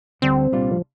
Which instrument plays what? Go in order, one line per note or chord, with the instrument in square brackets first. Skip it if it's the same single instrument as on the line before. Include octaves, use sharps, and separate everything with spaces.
[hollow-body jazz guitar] D2 D3 G3 D4 [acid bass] C4
[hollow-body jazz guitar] C2 A#2 G3 D4 F4
[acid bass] F3